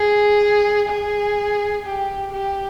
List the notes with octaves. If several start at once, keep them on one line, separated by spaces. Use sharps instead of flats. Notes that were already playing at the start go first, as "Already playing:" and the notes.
Already playing: G#4
G#4
G4
G4